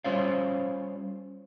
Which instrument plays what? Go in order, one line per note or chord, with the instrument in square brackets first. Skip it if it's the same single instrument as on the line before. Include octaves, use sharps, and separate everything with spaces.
[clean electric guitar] G3 C#4 F4 C5 C#5 F5